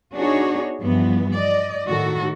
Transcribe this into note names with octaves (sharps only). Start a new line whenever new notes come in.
B3 D4 D#4 F#4 G#4 C#5
G2 E3 F3 G3 B3
D5 D#5
A2 D#3 F#4 A4